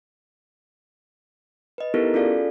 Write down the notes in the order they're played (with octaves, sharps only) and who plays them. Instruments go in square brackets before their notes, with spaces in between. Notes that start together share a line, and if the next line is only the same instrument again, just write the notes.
[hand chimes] B4 D#5
B3 D#4 E4 G4 A4 A#4
C#4 F4 G#4 A4 D5 F5